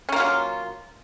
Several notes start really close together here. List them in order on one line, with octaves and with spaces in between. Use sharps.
C#4 A#3 F4 F#3